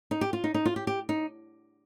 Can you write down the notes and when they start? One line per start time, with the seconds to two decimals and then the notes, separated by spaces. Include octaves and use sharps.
0.11 D#4
0.21 G4
0.33 F4
0.44 D#4
0.54 D#4
0.66 F4
0.76 G4
0.87 G4
1.09 D#4